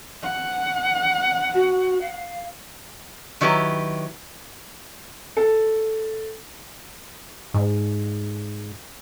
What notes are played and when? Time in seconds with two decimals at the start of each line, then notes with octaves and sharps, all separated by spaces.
0.23 F#5
1.54 F#4
2.01 F5
3.41 D#3 F#3 E4 G4 B4
5.37 A4
7.54 G#2